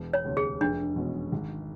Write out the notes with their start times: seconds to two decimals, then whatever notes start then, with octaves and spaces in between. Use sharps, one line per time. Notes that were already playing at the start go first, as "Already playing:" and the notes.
Already playing: E1
0.13 C#5
0.24 D2 C3
0.37 G#4
0.61 F1 D4
0.96 E2 B2 G#3 C#4
1.32 G#1